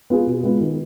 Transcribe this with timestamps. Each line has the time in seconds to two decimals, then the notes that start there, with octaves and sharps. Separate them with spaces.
0.10 B3 F4 G#4
0.27 B2
0.43 G#3 B3 F4
0.61 D#3